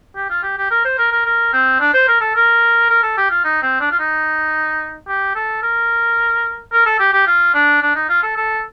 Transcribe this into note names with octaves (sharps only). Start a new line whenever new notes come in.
G4
F4
G4
G4
A#4
C5
A#4
A#4
A#4
C4
D4
C5
A#4
A4
A#4
A#4
A4
G4
F4
D#4
C4
D4
F4
D#4
G4
A4
A#4
A#4
A4
G4
G4
F4
D4
D4
D#4
F4
A4
A4